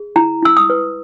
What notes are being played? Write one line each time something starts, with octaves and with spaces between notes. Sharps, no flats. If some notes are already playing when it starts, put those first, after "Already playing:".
Already playing: G#4
E4 A#5
E4 E6
D#6
B4